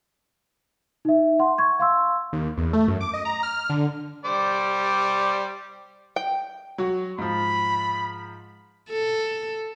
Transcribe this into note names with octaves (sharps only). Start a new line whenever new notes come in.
D#4 E5
F#5 C6
C#6 G#6
F5 C6 E6
D#2
E2
A3
F#2
D6
D#5
A#5
F6
D3
G3 C5 D5
G5
F#3 F#4
G#2 F3 B5
A4